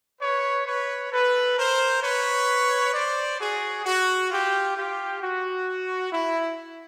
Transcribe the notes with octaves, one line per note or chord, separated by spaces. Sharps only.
B4 C#5
B4 C#5
A4 B4
A#4 C5
B4 C#5
C5 D5
F#4 G#4
F#4
F4 G4
F4 G4
F#4
E4